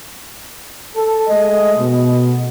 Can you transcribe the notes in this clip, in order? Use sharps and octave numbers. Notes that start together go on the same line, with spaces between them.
A4
G#3 A3 D#5
B2